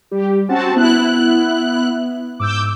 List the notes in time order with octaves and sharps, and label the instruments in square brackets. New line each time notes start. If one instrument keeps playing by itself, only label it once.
[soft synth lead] G3 [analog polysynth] G4
[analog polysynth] C4 F#4 A5 [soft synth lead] C#4
[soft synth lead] B3 [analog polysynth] E4 F#6
[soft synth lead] G#2 [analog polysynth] D6 E6 G6